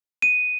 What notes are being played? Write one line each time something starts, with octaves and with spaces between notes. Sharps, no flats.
D#7